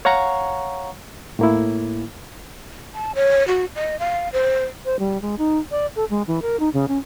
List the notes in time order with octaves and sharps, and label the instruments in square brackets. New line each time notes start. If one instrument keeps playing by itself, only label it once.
[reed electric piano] C#5 F5 F#5 A#5 C#6
A2 A#3 E4
[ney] A5
C#5
F#4
D#5
F5
C5
[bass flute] C5
G3
G#3
D#4
D5
A4
G#3
E3
A#4
D#4
C#3
C#4